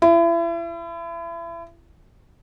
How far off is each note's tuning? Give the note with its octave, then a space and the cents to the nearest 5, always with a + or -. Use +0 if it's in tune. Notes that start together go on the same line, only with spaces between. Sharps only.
E4 +35